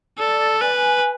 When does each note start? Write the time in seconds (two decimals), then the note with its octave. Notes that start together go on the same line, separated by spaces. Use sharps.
0.18 A4 D5
0.61 B4 G#5